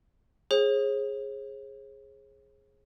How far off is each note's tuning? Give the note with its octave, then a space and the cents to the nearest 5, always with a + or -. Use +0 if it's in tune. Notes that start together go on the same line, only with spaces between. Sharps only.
G#4 +0 C#5 -45